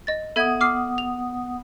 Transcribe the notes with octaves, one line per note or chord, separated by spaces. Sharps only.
D#5 A6
B3 A4 E5 F#5 D#6 G#6
D6 F6 C7
F7